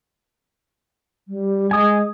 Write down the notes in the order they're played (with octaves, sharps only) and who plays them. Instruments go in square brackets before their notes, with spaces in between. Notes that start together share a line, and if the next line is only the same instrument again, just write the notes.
[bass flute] G3
[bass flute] G#3 [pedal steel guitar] G#5 D#6